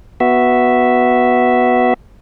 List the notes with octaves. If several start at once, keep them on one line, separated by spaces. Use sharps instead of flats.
B3 F#4 E5